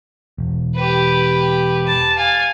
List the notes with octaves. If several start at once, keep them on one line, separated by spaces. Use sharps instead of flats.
E1
G4 B4
A5
F5 G#5